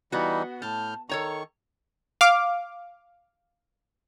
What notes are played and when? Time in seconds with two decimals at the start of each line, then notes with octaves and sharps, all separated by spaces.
0.12 E3 G3 B3 D#4 F#4
0.62 A2 A5 F6 G6
1.09 D#3 A4 C#5 A#5 C#6
2.21 F5 D6